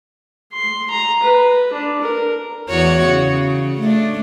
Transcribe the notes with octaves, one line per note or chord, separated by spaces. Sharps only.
C6
A#5
B4
D4
A#4
E2 F#4 C#5
C#3
A3 D4